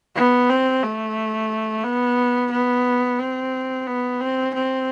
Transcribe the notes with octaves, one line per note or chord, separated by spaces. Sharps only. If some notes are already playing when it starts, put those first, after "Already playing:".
B3
C4
A3
B3
B3
C4
B3
C4
C4